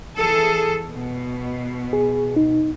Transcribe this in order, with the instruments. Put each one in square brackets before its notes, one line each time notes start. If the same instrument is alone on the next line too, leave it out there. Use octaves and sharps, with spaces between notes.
[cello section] E3 G#4 A4
B2
[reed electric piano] G#4
D#4